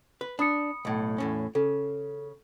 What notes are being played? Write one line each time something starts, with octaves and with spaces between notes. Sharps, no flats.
B4
D4 B5 D#6 C#7
B1 A2
E2 A2 C#4
C#3 A4